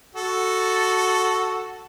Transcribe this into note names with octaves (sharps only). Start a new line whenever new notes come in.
F#4 A4